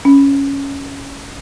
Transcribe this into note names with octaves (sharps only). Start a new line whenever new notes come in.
C#4